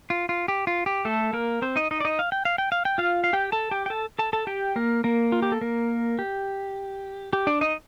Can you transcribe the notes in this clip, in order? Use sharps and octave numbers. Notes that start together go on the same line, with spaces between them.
F4
F4
G4
F4
G4
A3 A4
A#3 A#4
C4 C5
D#4 D#5
D#4 D#5
D5
D#4 D#5
F5
G5
F5
G5
F5
G5
F4 F5
F5
G4 G5
A4 A5
G4 G5
G5
A4 A5
A4 A5
A4 A5
G4 G5
A#3 A#4
A#3 A#4
F4
G4
A4
A#3 A#4
G4
G4
D4 D5
D#4 D#5